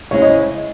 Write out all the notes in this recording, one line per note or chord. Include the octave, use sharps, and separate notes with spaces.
C#3 G#3 C4 E4 G#4 C#5
D#5